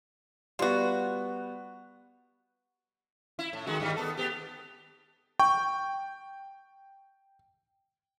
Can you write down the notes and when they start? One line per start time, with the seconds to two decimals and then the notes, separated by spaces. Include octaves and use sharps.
0.59 G3 B3 F4 F#4
3.39 E4
3.53 A2
3.66 D#3 G#3 F#4
3.80 G2 D#3 G3
3.97 B3 A4
4.17 B3 G4
5.39 G5 C#6